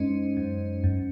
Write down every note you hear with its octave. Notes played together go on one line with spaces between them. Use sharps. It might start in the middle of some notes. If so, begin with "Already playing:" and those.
Already playing: F#2 G#3 C#4 D#4 C5 D#5
F#2
F#2